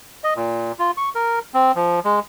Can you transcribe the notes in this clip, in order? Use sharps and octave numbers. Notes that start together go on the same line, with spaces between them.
D#5
A#2
F4
C#6
A#4
C4
F3
G#3